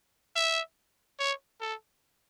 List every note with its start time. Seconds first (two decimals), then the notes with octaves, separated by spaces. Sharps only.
0.36 E5
1.19 C#5
1.61 A4